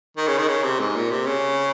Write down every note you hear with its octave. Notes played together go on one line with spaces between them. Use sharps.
D#3
C#3
D#3
C#3
C3
G#2
A#2
C3
C#3